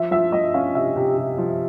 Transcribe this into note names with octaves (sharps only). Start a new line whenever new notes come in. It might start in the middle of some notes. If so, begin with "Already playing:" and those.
Already playing: F3 E5
F3 E5
F3 D#5
C#4 F5
C3 E5
C3
C3
F3